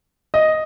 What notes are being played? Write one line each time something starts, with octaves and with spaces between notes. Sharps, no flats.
D#5